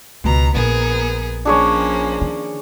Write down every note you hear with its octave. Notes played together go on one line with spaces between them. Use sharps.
C#2 B2 A#5
A#1 B3 G#4 A#4
F3 A#3 C#4 D4 G#4 C#5
D#3